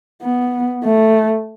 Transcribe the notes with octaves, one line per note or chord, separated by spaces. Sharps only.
B3
A3